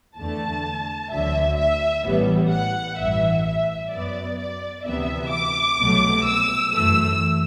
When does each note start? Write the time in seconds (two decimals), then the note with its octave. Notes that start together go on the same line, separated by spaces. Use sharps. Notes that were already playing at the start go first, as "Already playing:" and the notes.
0.17 E2 D3 A3 A5
1.11 D2 D3 F#3 E5
1.57 E5
2.04 A1 A2 E3 G3 B3
2.50 F#5
2.98 A1 G2 E3 E5
3.44 E5
3.90 F#2 F#3 B3 D5
4.38 D5
4.84 D2 C3 E3 B3 E5
5.31 D6
5.78 C2 B2 F#3 A3
6.24 E6
6.71 F#2 E3 A3 E6